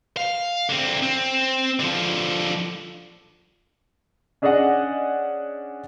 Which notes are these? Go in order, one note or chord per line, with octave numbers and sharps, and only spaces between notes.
F5
D3 C4
C4
D3 F3
C#4 D4 G#4 D5 D#5 F#5